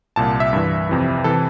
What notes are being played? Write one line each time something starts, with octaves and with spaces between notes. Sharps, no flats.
C2 A#2 A5
E5
G2 E3
F2 C3 E3
C3 E3 A4